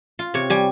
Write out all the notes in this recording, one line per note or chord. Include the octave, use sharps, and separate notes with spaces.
F4
C3 C#5
G3 G#5